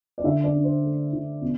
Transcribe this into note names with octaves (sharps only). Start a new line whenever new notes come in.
D5
D3 E5
D5
D4
C5
A3
D3
B2